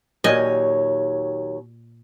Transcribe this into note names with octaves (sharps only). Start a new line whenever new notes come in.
D#2 A#2 F#3 C#5 D#5 G#5